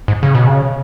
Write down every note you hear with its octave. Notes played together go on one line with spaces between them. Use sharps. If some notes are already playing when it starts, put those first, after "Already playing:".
G#2
C#3
B2
C#3